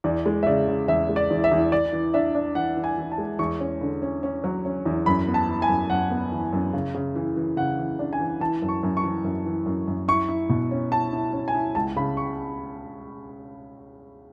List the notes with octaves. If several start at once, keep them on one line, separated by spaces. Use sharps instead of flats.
E2 D5
G#3
E5
C#3 D5
C#3
E2 E5
G#3
D5
E2
E5
E2
E3 D5
E3
D4 E5
D4
E3 F#5
E3
G#5
E3
A5
G#3
E2 C#6
C#4
D3
C#4
C#4
F#3
C#4
E2
F#2 B5
B3
A5
E3
G#5
F#2
F#2 F#5
B3
E3
F#2
C#3
C#3
E3
E3
C#3 F#5
E3
D4
G#5
E3
E3 A5
F#2
C#6
F#2
C#6
E3
F#2
E3
F#2
F#2
E4 C#6
E4
B2
C#4
E4 A5
E4
C#4
G#5
E4
C#2 A5
C#3 B5
C#6